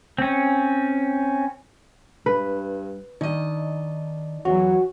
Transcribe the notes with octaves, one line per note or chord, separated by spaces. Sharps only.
C4 C#4
G2 B4
D#3 D4 D#4 D5 D#5
E2 E3 F#3 F#4 C#5